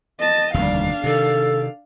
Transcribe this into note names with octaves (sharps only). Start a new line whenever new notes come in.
D#5 A5
F1 D#2 D3 G3 D4 F5
C3 D#3 A4